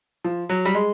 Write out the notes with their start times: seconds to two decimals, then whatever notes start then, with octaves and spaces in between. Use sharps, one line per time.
0.24 F3
0.49 F#3
0.65 G3
0.75 G#3